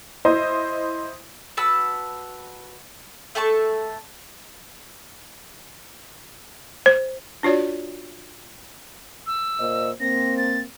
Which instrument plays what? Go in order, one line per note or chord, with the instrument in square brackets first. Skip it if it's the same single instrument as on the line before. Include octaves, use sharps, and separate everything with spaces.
[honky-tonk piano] E4 C5 D#5
[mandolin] F#4 B4 A5 E6
A3 A4 A5 C#6
[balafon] C5
D4 F4 F#4 C#5 D5
[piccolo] E6
[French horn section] A#2 C5 D#5
[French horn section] A#3 C4 [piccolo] A#6
[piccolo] A6